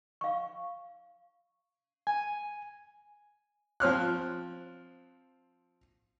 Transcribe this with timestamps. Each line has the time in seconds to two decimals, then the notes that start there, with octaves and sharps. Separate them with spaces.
0.21 F5 C#6
2.07 G#5
3.80 F3 C4 F6 F#6